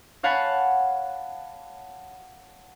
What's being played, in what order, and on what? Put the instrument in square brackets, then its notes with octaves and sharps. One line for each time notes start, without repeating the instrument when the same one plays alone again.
[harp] C#5 F5 F#5 G#5 A5 B5